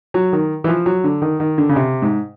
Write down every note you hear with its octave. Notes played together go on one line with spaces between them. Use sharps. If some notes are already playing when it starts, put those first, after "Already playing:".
F#3
D#3
E3
F3
F#3
D3
D#3
D#3
D3
C#3
C3
G#2